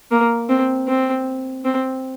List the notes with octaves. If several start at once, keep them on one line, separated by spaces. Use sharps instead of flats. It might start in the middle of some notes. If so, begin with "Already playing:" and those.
A#3
C4
C4
C4